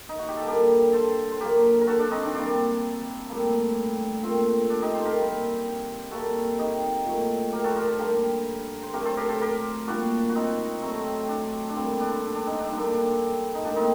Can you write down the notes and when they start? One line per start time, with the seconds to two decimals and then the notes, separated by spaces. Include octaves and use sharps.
0.09 D#4
0.19 F#4
0.28 G4
0.37 A4
0.46 D3 G3 A#3 G4 A#4
0.93 A4 C5
1.31 C5
1.40 D3 F#3 A#3 G4 A#4
1.81 A#4
1.87 F#4 A4
1.99 D4
2.11 C4 D#4
2.23 D4
2.34 C3 G3 A#3 D4
3.29 A2 G3 A#3
4.23 A#2 A3 C4
4.70 D4
4.82 D#4 G4
4.93 A4 C5
5.05 G4 A#4
5.17 C3 G3 A#3
6.11 C3 G3 A#3 F#4 A4
6.58 D#4 G4
7.05 A#2 F#3 A3
7.52 G4 A#4
7.64 F#4 A4
7.70 C5
7.76 G4 A#4
7.88 A4 C5
7.99 D3 G3 A#3 G4 A#4
8.83 C5
8.93 C3 F#3 A3 G4 A#4
9.05 A4 C5
9.17 G4 A#4
9.29 A4 C5
9.41 G4 A#4
9.87 A#2 G3 A#3 D4 F#4
10.29 F#4
10.35 C4 D#4
10.82 C3 F#3 A3 C4
11.29 D4
11.69 D4
11.76 D3 G3 A#3 C4
12.00 D4
12.23 D4
12.35 D4
12.47 C4 D#4
12.59 D4
12.67 D3 G3 A#3 D#4
12.77 D4
13.55 D#4
13.64 A2 G3 A#3 D4
13.76 C4 D#4